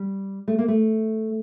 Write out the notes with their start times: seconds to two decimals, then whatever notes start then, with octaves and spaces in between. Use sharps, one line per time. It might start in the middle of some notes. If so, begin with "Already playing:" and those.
Already playing: G3
0.48 A3
0.58 A#3
0.68 A3